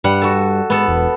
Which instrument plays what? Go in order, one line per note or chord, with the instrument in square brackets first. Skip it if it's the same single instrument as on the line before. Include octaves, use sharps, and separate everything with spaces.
[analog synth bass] G2 [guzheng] G3 F#5
[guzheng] F#4 A4
[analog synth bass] G#2 [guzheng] B3 A4
[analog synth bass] E1